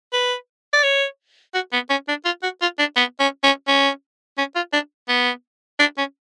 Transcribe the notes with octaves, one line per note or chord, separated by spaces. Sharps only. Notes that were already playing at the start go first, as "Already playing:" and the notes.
B4
D5
C#5
F#4
B3
C#4
D4
F4
F#4
F4
D4
B3
C#4
C#4
C#4
C#4
F4
D4
B3
D4
C#4